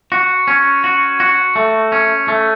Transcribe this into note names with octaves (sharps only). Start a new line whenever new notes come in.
F#4
C#4
F#4
F#4
A3
C#4
A3